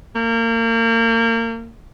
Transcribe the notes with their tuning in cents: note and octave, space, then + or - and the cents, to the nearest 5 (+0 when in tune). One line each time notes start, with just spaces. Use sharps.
A#3 -30